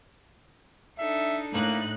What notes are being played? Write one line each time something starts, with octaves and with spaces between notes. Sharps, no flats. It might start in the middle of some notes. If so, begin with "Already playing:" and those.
D4 D#4 A4 E5
A2 A#3 D#4 F#6